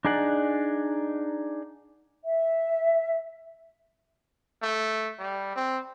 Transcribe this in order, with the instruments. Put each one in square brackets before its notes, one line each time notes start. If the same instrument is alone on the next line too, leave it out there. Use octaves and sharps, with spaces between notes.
[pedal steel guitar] D4 D#4 G#4 D5 F#5
[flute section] E5
[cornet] A3
G3
C4